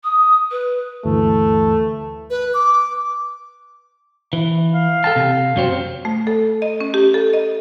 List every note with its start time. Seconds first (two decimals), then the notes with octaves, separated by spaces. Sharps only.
0.04 D#6
0.51 B4
1.05 D2 G2 E3 A3
2.30 B4
2.54 D6
4.33 E3
4.72 F5
5.04 A4 G5 A5
5.16 C3
5.56 F#2 F#3 C4
6.05 A3
6.27 A4
6.62 D#5
6.81 C#4
6.94 G4
7.14 A4
7.33 D#5